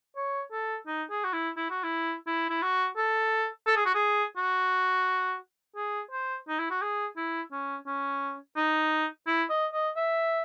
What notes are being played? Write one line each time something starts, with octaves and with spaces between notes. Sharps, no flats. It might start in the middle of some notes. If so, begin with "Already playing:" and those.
C#5
A4
D#4
G#4
F#4
E4
E4
F#4
E4
E4
E4
F#4
A4
A4
G#4
F#4
G#4
F#4
G#4
C5
D#4
E4
F#4
G#4
E4
C#4
C#4
D#4
E4
D#5
D#5
E5